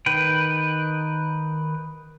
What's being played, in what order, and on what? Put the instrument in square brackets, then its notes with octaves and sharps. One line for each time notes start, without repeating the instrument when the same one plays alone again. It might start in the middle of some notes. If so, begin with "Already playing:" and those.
[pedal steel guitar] D#3 B4 G5